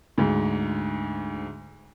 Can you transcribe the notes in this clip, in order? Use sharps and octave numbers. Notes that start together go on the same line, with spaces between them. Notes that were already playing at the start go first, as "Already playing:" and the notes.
D2 G#2